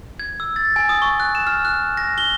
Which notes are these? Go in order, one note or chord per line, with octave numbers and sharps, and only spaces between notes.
G#6
E6
A6
G#5
D#6
C#6
F#6
E7
F6
F#6
A#6
G7